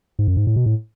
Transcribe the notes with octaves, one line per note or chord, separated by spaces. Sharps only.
G#2
F#2
G#2
A2
B2
A2